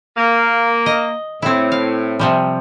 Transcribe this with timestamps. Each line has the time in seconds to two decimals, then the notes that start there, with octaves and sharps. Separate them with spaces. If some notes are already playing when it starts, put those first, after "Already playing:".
0.17 A#3
0.86 D#5
1.42 A2 C4 E4
1.72 F5
2.19 C3 F3 G3